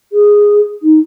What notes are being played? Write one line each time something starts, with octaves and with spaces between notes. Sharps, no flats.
G#4
D#4